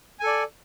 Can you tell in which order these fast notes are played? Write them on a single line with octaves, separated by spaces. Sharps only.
G#5 A4 D5